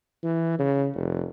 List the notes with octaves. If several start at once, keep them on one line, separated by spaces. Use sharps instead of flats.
E3
C#3
F1